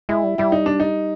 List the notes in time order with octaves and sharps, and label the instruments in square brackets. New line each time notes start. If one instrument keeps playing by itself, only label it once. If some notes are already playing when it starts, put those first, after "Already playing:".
[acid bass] G#3 [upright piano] E4
[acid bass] G3
[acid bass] G3 [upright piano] E4
[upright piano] D#4
D4
D#4